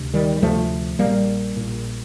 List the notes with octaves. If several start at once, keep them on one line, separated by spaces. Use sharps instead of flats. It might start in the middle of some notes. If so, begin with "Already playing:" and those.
Already playing: D2 C3
D#3 G3
G3
D2 C3 F3 A3
A#1 A#2 G3 A#3
A#1 A#2